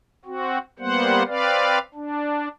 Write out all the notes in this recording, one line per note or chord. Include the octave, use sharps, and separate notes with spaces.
C4 F#4
G3 A#3 B3 C5 F#5
C4 B4 D5 F5
D4